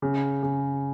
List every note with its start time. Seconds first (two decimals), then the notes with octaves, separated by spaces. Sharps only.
0.02 C#3
0.43 C#3